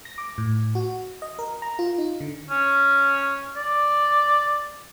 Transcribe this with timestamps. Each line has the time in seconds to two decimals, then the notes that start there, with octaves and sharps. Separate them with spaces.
0.05 A#6
0.18 D6
0.38 A2
0.75 F#4
1.22 D#5
1.39 A#4
1.62 A#5
1.79 F4
1.98 D#4
2.20 D3
2.50 C#4
3.56 D5